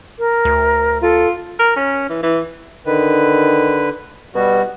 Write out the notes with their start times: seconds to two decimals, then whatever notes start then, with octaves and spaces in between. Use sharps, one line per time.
0.19 A#4
0.45 D2
1.02 F4 A4
1.59 A#4
1.76 C#4
2.09 E3
2.23 E3
2.86 D3 D#3 B4
4.35 B2 G3 F#4